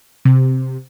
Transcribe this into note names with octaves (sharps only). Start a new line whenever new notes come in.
C3